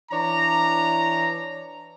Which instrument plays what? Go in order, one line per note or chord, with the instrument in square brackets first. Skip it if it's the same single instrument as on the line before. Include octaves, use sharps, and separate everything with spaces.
[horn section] E3 D4 C#5 A#5